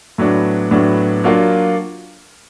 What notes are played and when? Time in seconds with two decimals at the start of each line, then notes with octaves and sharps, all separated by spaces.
0.18 A2 F#3 B3 D4
0.71 A2 F#3 B3 D4
1.24 F#3 A#3 D4 F4